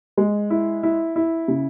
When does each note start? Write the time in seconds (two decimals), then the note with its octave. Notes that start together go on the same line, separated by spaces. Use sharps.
0.17 G#3
0.50 E4
0.83 E4
1.16 E4
1.48 C#3